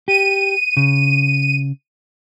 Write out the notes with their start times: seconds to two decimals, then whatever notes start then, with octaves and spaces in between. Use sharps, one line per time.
0.08 G4 D#7
0.77 C#3